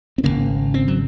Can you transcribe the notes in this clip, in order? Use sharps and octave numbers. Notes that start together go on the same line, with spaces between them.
C4
G#1 F#2 C#3 A#3
C4
F#3